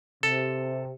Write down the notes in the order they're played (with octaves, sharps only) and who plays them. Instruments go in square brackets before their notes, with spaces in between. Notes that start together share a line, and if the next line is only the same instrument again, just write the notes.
[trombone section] C3 [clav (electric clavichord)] A4